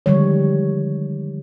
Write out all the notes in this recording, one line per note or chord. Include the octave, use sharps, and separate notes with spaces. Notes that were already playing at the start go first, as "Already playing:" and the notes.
D3 D#3 F3 G3 G#3 C#5